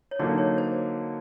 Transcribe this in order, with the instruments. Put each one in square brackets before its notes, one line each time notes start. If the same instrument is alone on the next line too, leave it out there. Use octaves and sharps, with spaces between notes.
[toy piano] C#5
[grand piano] D3 F#3 A#3 D#4 [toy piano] D5
[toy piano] C#5
C5